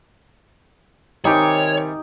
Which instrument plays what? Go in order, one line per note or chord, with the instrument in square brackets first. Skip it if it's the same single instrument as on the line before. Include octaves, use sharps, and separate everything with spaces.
[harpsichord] C3 G3 G#4 [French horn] D#3 [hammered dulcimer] D#4 G4 [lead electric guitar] C#5